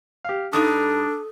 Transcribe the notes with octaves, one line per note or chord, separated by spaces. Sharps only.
G4 F5
G2 G3 D4 D#4 A4 D#6